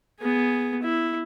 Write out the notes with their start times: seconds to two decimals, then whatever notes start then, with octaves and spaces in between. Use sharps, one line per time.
0.20 B3 G#4
0.82 E4